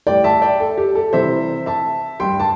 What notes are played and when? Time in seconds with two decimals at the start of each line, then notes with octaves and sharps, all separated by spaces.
0.07 A2 G3 D5 G5
0.24 E5 A5
0.42 D5 G5
0.60 A4
0.77 G4
0.95 A4
1.13 C3 E3 G3 C5 E5
1.66 E5 A5
2.20 G2 G3 G5 C6
2.40 A5